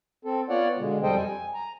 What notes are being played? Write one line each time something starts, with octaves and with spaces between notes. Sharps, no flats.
C4 A4
B3 F4 C#5 D5 F#5
B2 D3 G#3
F2 G3 A4 C5 D#5 G5
G#5
A#5